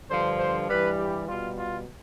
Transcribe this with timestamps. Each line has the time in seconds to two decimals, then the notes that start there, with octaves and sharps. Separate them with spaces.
0.09 G2 D3 F3 C5
0.39 C5
0.69 G2 E3 G3 B4
0.99 G4
1.28 B2 G3 F4
1.57 F4